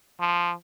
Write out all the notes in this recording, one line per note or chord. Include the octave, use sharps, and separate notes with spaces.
F3